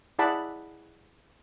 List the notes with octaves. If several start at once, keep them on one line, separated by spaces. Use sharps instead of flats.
E4 G#4 D5 F#5 A5 B5